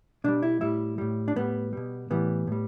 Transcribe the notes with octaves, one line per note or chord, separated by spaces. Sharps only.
B2 G3 D4
E4
A2 G3 E4
A2 G3
D4
A2 G3 B3
B2 G3
A2 E3 G3 B3
A2 G3